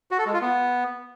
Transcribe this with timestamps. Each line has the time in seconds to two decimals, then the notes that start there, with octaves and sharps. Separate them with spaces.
0.11 F#4
0.19 A4
0.26 G#3
0.34 F4
0.41 B3